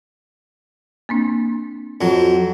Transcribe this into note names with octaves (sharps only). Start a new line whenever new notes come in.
A#3 C4 D4
F2 F#3